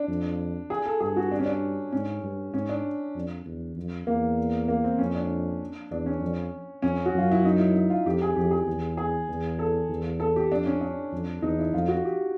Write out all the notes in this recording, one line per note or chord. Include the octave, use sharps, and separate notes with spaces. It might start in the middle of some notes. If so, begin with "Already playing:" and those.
Already playing: D4
F2
G#4
A4
G2 G#4
F#4
D4
C#4
D4
G#2 C#4
G2
G#2 C#4
D4
F2
E2
F2
E2 A#3
A#3
C4
F2 C#4
D4
E2 D4
C#4
F2
F2 C#4
F#4
F#2 F4
E4
D#4
E4
E4
F4
F2 G4
G#4
F2 G4
G#4
E2
G#4
E2
A4
E2
A4
G4
F2 D4
C#4
D4
F2
E2 D#4
E4
F2 F4
F#4
G4